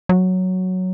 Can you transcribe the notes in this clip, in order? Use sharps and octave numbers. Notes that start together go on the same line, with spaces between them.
F#3